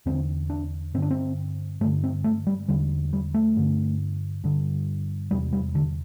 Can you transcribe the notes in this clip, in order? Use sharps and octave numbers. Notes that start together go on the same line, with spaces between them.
E2 D3 C4
D4
G2 D3 C4
D4
C4
G2 D3 A3
C4
A3
G3
E2 D3 G3
G3
A3
G2 D3
G2 D3
E2 C3 G3
G3
D3